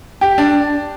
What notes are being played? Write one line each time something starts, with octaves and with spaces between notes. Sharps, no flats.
G4
D4